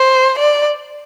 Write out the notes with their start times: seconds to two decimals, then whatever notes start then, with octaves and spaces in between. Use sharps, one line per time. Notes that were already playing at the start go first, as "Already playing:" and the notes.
Already playing: C5
0.39 D5